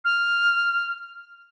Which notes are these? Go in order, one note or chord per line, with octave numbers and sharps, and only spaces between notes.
F6